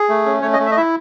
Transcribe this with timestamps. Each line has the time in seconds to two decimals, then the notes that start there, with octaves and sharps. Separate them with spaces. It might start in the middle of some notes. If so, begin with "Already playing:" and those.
Already playing: G#4
0.09 A3
0.26 C#4
0.42 A3 C#5
0.53 D#5
0.59 A3
0.66 E5
0.71 D#5
0.77 E4 E5